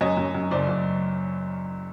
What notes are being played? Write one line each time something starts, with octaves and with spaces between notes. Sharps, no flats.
F#2 C#5 D#5
F#2
F#2
F#1 C5 D5
F#1